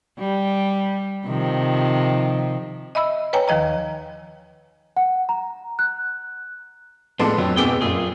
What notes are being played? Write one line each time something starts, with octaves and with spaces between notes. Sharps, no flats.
G3
C3 D#3 F3
D#5 E5 B5 E6
B4 C#5 G5 G#5 A#5
D#2 D#3 F3 D#5 A#5
F#5
A#5
F#6
A2 F3 G#3 B3 D4 A4 C6
F2 F#3
G#2 B2 B3 G#4 G5 D6 E6
F#2 A#2 F4 G#4